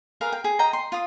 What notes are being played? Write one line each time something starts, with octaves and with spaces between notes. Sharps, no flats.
G#4 A#4 B4 F5
G5
G#4
D#5 G5 A#5
C6
F4 D#6